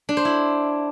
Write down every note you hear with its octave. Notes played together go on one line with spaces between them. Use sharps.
D4
C5
E4